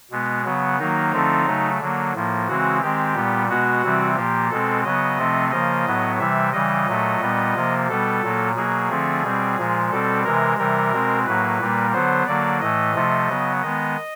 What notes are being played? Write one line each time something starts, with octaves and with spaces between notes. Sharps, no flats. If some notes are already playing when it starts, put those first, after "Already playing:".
B2 G#3 B3
C#3 F#3 B3
D#3 F#3 A#3 D#4
D3 F3 A3 C4
C#3 F#3 A3
D3 F#3 A#3
A2 F3 A#3
C#3 E3 G#3 C4 F#4
D#3 G#3 C4 G4
A#2 G3 B3
B2 G#3 B3 F#4
C3 E3 G3 C4
A#2 F3 A#3 G4
B2 G#3 C4 A4
C#3 F#3 B3 D#5
C3 F3 A3 C4
C#3 F3 A#3 D#5
A2 F#3 B3
C3 E3 G3 E5
C#3 E3 G3 D#5
A#2 F#3 A3
A#2 G3 B3
C3 F3 A#3
B2 G3 B3 A4
A#2 F#3 A#3
B2 F#3 A#3 G#4
D3 F3 A3 C4
B2 G3 C4
A#2 F3 G#3
B2 G3 C4 A4
C3 E3 G#3 A#4
C3 E3 G3 A#4
B2 G#3 C4
A2 F#3 A#3 B4
A#2 G3 A#3
D3 F#3 B3 C5
D3 F#3 A#3 D5
A2 E3 A3 D#5
C3 F3 A3
C#3 F#3 B3
D#3 G#3 B3 D#5